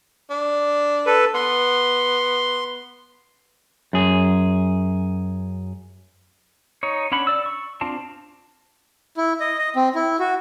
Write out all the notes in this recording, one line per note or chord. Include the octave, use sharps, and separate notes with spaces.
D4
A4 B4
B3 C6
F#2 G#4
D#4 C#5
C#4 D4 C#5 F#5 B5
D5 E6
C#6
C4 D4 F4 A5
E4
D#5
D#5
C4
E4
F#4